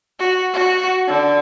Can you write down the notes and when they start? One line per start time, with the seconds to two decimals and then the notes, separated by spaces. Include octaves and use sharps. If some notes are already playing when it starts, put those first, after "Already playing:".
0.19 F#4
0.53 F#4
1.07 D3